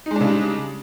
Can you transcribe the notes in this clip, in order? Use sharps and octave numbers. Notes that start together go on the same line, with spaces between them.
C#3 G3 G#3 D4 D#4